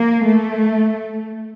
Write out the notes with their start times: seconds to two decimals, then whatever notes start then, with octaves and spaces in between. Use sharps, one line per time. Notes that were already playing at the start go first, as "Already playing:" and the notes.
Already playing: A#3
0.25 A3